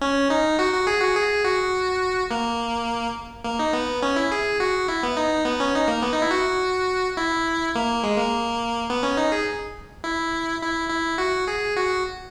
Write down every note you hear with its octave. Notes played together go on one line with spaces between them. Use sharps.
C#4
D#4
F#4
F#4
G#4
F#4
G#4
F#4
A#3
A#3
D#4
B3
C#4
E4
G#4
F#4
E4
B3
D#4
B3
C#4
D#4
A#3
B3
D#4
E4
F#4
E4
A#3
G#3
A#3
B3
C#4
D#4
G#4
E4
E4
E4
F#4
G#4
F#4